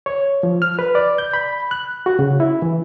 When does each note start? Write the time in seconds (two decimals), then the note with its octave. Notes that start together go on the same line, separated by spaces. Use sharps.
0.06 C#5
0.43 F3
0.62 F6
0.79 B4
0.95 D5
1.18 G6
1.33 B5
1.71 F#6
2.06 F#4
2.19 C#3
2.40 E4
2.62 E3